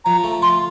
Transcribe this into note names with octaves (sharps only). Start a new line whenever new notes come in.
F3 A#5
A3
F4 C6